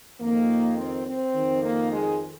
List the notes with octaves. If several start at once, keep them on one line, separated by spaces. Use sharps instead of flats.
F2 D#3 A#3
C4
C4
F2 D#3
A#3
G#3